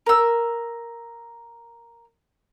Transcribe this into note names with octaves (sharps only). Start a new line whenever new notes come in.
A#4 E6